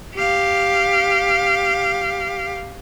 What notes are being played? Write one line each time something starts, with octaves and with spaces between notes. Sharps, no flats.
G4 F5